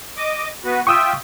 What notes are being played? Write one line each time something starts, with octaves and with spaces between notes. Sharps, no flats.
D#5 D6
B3 F#4 B4
F4 E5 G5 C#6 D#6 E6